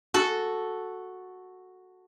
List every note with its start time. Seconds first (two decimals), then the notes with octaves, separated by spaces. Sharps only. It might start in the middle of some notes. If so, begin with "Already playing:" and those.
0.14 F#4 A4